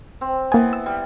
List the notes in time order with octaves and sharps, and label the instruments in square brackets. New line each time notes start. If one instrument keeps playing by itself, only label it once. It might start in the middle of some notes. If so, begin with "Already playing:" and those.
[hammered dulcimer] C4
[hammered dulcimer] E3 B3 [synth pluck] A#3 G#5
[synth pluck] E6
[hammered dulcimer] G3